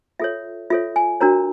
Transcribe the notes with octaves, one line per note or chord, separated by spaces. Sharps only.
F4 A4 C#5 E5
F4 A4 C#5 E5
G#5
D4 F#4 A#4 C#5 A#5